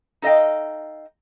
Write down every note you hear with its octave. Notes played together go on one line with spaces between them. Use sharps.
D#4 A4 D#5 F5 G5